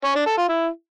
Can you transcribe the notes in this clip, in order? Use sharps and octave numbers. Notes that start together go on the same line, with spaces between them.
C#4
D4
A4
F4
E4